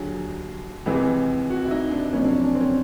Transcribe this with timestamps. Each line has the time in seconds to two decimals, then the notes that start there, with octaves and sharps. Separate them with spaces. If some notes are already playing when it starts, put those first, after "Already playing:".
Already playing: D#2 D3 F#3 G#4
0.86 C#2 C3 E3 G#3
1.50 F#4
1.65 E4
1.71 D#4
1.91 D4
2.13 F#1 F2 C3 C#4
2.24 D4
2.29 C#4
2.44 D4
2.55 C4
2.61 C#4